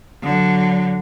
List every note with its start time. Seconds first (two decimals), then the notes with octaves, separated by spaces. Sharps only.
0.23 D3 F#3